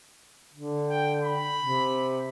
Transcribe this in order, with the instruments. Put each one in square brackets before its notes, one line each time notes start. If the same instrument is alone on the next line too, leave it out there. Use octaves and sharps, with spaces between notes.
[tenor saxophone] D3
[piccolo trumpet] G5
B5
[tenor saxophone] C3